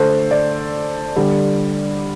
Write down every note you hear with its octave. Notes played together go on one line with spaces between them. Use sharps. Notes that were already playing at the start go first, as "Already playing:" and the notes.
Already playing: D3 A3 A4 C5
D5
D3 G3